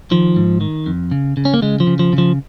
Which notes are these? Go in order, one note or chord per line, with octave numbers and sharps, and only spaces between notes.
D#3 F3
G#2
D#3
F2
C#3
C#3
C#4
A#3
C#3 G#3
F3
C#3
F3
C#3
F3